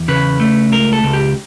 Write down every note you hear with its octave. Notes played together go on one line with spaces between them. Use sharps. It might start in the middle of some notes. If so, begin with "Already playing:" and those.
Already playing: E2
C#3 B4
A3
C#2 A#4
A4
C#2
G4